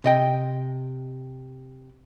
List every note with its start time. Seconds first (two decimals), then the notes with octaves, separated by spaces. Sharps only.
0.04 C3 D#5 G5